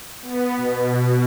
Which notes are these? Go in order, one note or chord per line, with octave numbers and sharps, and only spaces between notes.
B3
B2